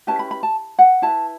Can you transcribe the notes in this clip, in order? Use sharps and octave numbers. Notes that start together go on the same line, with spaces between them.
C#4 E4 G4 B4 A5
B5
B5
A5
F#5
E4 B4 A5